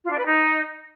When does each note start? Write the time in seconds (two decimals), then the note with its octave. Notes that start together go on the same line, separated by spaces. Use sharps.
0.04 F4
0.11 D4
0.17 B4
0.24 D#4